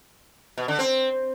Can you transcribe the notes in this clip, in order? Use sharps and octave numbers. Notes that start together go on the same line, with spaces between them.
B2
D3
C4